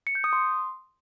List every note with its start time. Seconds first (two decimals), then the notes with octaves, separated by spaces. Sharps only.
0.07 C#7
0.15 G6
0.24 D#6
0.33 C6